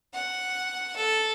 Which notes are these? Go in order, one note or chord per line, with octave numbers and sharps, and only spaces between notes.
F#5
A4